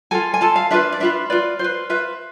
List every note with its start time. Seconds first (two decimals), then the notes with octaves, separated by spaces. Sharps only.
0.11 F4 A4 G#5
0.34 G#5
0.41 F4 A4 A5
0.56 F5
0.71 D4 F4 B4 E5
0.92 D5
1.00 D4 F4 B4 E5
1.30 F4 B4 D5
1.59 F4 B4 C5
1.90 F4 B4 E5